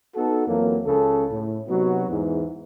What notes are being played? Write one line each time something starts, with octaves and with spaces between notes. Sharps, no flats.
B3 D#4 F#4 A4
F2 E3 F#3 A#3
C#2 C#3 A4
A2
C3 F#3 B3 D#4 F#4
E2 G#2 E3